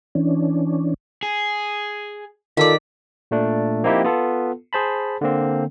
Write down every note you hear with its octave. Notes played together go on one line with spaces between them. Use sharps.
E3 C#4 D4
G#4
D#3 F4 A4 D5 B6
A#2 A3 D4
F3 A#3 C4 D#4 E4 G4
B3 F4 A4
G#4 C5 A5 B5
D3 A#3 C4